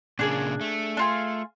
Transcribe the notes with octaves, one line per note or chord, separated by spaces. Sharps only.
A#2 C#3 A#3 D4 G#4
A3
D4 F4 G#4